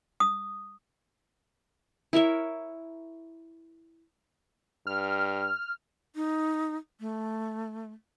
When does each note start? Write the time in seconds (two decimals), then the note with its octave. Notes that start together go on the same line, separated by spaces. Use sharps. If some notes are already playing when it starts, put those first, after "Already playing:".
0.20 D#6
2.13 E4 A#4 C#5 E5
4.87 G2 F6
6.15 D#4
7.00 A3